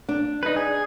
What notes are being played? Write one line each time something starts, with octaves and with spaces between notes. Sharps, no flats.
D4
D#4 B4
G#4